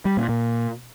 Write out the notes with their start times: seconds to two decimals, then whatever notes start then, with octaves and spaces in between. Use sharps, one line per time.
0.05 G3
0.17 A#2
0.29 A#2